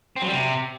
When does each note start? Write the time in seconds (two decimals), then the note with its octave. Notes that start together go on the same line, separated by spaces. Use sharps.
0.16 C4
0.22 F#3
0.27 G3
0.32 C3